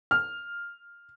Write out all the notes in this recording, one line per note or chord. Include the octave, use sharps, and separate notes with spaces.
F6